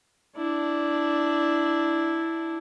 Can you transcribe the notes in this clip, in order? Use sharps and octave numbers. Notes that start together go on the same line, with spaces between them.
D4 E4